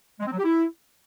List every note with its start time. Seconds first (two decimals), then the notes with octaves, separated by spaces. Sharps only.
0.20 G#3
0.26 C4
0.32 F#3
0.38 G4
0.44 E4